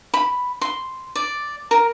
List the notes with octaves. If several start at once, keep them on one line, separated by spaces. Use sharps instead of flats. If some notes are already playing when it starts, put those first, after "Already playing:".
B5
C6
D5
A#4